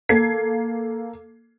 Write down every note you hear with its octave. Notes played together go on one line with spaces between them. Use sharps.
A#3 A4 G#6 C7